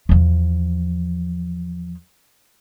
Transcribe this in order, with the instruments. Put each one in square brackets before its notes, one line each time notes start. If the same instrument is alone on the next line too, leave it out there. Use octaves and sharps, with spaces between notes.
[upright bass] E2 F3